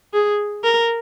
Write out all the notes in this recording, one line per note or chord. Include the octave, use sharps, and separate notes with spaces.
G#4
A#4